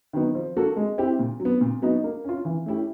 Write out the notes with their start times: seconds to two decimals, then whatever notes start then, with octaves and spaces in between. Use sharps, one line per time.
0.13 D#3 F#3 B3 D#4
0.35 F3
0.56 A#3 D4 F#4 A4
0.77 G#3
0.98 C4 E4 G4
1.19 A#2
1.40 F#3
1.45 B3
1.61 A#2
1.82 F#3 B3 D#4 F#4
2.04 A#3
2.24 C#4 F4
2.45 E3
2.66 A3 C#4 E4 G4